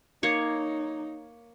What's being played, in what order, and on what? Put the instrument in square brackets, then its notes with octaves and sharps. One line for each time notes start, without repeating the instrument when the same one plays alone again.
[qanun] A#3 C#5 [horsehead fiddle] D#4